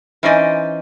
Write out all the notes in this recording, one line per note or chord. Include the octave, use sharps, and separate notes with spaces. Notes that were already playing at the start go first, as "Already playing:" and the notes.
E3 C#4 D#4 C5 D5 D#5